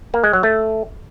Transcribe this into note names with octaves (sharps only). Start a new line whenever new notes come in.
A#3
G#3
F#3
A3